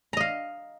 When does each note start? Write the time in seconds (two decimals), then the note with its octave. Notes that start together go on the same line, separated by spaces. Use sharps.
0.13 A#5
0.17 D#5
0.21 F5